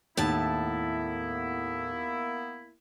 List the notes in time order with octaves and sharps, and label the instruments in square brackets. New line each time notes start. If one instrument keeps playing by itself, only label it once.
[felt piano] D#2 [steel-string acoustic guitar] A2 A5 [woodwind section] A#3 B3 E4